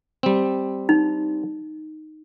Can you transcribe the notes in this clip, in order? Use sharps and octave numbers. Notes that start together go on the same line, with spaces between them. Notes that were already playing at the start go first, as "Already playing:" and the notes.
G3 C4
D#4